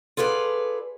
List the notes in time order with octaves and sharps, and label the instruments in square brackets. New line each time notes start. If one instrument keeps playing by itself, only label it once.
[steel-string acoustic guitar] F4 G#4 A4 B4 D5